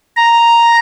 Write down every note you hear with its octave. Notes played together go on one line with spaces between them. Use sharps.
A#5